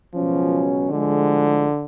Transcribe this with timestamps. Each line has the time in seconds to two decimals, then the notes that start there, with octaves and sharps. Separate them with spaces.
0.14 C#2 B2 F3 F#3 C#4
0.90 A2 D3 F3 G#3